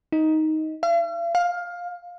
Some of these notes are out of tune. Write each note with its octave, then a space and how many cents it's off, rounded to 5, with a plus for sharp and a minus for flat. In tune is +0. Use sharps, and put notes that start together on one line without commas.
D#4 +10
F5 -45
F5 +15